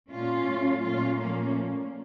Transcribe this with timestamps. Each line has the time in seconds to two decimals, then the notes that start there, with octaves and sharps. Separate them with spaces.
0.10 A#2 A3 C#4 F4
0.46 A2 F#3 A3
0.82 A#2 A3 C#4 F4
1.18 A#2 F3 A3 A#3 C#4